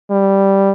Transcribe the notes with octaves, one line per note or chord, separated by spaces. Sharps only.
G3